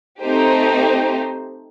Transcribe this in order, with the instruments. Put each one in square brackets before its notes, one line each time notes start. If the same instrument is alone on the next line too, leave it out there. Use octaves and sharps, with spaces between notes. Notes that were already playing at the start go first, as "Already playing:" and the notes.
[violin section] A3 C4 D#4 G4 C5